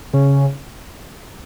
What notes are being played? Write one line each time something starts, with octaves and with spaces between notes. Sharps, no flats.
C#3